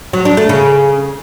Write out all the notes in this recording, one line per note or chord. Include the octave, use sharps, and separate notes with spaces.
F#3
D4
A3
C#3